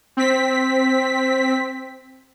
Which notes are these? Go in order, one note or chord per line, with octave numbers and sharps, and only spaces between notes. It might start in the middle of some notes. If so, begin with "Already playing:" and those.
C4 B6